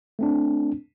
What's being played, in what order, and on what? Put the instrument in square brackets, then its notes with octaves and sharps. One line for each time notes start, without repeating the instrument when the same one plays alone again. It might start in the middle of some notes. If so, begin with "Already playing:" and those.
[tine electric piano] A3 C4 D4